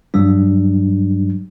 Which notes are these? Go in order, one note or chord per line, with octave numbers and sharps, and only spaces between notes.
G2 F#3 G3 D4